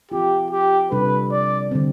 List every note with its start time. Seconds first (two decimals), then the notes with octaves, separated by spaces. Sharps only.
0.11 F3 C4 F4 G4
0.51 G4
0.91 C3 G3 D4 A4 B4
1.31 D5
1.71 D3 G3 C4